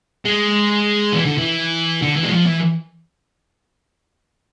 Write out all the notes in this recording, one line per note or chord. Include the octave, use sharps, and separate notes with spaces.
G#3
E3
D3
E3
D3
E3
G#3
F3
E3